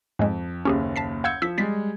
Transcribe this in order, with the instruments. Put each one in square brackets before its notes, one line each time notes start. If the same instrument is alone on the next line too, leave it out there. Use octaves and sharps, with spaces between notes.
[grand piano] F2 [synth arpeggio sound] G#2 G#3
[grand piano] F#1 D#2 [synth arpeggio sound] C#4 G4 G#4
[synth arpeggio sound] A5 B6 C7
[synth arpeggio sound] F5 F#5 E6 [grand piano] G6 G#6 C#7
[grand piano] F3 [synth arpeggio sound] E6 B6
[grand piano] G3 G#3 [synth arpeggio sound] A6 B6